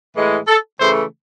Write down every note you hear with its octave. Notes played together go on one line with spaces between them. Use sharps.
A2 E3 G#3
A4
C#3 E3 A3 C5